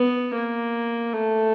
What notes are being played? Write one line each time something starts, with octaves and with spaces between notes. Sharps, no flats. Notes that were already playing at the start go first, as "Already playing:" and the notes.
Already playing: B3
A#3
A3